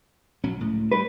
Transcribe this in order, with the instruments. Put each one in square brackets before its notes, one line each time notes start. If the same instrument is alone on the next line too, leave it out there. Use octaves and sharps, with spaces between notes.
[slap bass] A#1 F#3 C#4
C#2 A2
[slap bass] G3 [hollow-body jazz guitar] B4